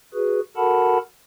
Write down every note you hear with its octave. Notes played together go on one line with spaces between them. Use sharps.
F#4 G#4 B4
F#4 A4 A#4 F#5 A5 B5